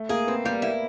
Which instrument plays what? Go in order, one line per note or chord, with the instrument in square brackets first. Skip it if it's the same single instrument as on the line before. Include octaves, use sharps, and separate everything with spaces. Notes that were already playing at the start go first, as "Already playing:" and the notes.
Already playing: [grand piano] A3
[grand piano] A#3 [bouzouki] G#4
[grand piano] B3 [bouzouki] C4
[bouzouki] G3 [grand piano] A#3
[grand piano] A#3 [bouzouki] E4